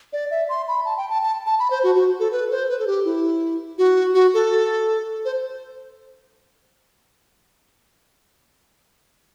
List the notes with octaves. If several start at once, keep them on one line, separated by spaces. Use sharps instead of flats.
D5
E5
C6
B5
A5
G5
A5
A5
A5
B5
C5
F#4
F#4
A4
B4
C5
B4
A4
G4
E4
F#4
F#4
A4
C5